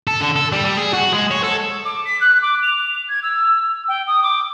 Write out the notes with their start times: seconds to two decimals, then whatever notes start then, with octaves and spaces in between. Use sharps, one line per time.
0.07 A4
0.21 D3
0.36 A4
0.52 G3
0.65 G3
0.77 G#4
0.93 F#4
1.12 G#3
1.31 C#5
1.43 A4
1.85 D6
2.05 B6
2.21 F#6
2.42 D6
2.62 F7
3.08 G#6
3.22 E6
3.88 G5
4.07 D#6
4.23 D6